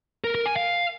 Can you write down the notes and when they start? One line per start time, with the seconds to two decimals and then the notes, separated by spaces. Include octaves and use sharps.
0.24 A#4
0.35 A#4
0.46 G#5
0.56 F5